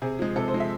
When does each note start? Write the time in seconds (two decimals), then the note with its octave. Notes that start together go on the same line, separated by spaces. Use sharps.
0.02 C3 G#4
0.19 F3 G#3
0.36 C3 A4
0.48 C5
0.54 F3 G#3
0.60 E5